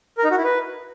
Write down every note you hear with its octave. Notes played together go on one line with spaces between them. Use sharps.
A#4
D#4
F#4
E4
B4